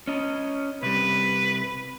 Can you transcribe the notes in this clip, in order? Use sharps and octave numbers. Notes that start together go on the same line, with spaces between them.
C#4 D#5
C3 G3 B4